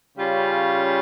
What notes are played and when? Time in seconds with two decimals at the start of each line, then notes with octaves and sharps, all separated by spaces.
0.17 C#3 G3 C#4 F4